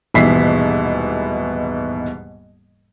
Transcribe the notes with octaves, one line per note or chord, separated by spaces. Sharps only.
D#1 G#2 B2 E3 B6 C7